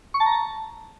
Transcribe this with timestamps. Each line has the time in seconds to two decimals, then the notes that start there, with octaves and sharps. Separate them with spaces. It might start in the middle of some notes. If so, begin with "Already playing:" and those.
0.14 C#6
0.20 A5
0.26 A#5
0.32 A5